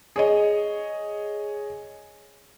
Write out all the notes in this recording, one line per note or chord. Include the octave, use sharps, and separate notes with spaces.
G#4 C#5 D#5